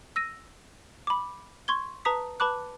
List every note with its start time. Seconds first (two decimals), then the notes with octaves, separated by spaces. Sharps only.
0.16 E6 A#6 D#7
1.07 B5 D6
1.68 C6 C#6 G#6 G7
2.05 B4 A5 A#5 D#6 B6
2.40 B4 A5 B5 D6 F#6